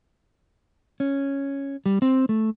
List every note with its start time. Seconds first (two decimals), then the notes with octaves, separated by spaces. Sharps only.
1.00 C#4
1.86 G3
2.02 C4
2.29 A3